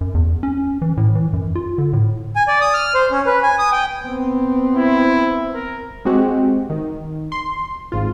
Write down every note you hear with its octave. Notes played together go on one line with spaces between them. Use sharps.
F#2
E2
C#4
E3
A2
E3
F#2
F4
D3
A2
G#5
D5
D#6
F6
C5
C#4
B4
G#5
D#6
G5
B3 C4
E4
A#4
G#3 C4 F#4 G4
D#3
C6
G#1 G#2 F4